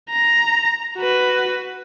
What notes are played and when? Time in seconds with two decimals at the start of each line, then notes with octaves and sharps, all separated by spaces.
0.10 A#5
0.98 F#4 B4